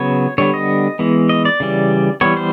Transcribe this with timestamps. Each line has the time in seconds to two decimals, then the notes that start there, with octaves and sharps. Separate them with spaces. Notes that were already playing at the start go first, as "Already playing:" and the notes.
Already playing: C#3 F#3 B3 C#5
0.38 D3 G3 B3 C#5
0.54 D#5
0.99 E3 G#3 B3
1.29 D#5
1.45 D5
1.60 C#3 E3 G3
2.21 E3 G3 B3 C#5
2.37 C5